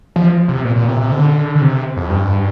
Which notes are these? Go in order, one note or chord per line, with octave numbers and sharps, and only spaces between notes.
F3
C3
A#2
A#2
C3
C3
D3
D3
C3
F2
G2